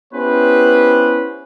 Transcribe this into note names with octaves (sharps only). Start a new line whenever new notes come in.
B3 C#4 E4 G4 B4 C5